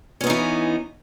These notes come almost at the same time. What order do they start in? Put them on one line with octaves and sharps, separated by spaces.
C#4 B3 D#4 E3